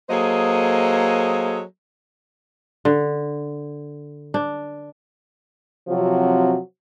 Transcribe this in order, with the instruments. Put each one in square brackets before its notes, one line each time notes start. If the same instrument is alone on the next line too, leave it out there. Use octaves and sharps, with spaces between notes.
[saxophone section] F#3 A#3 G#4 A4 C5 D#5
[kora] D3
D4
[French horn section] C3 F3 F#3 C4 F#4